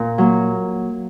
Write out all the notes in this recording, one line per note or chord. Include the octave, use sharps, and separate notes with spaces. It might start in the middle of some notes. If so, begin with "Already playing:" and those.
Already playing: A#2
F#3 A#3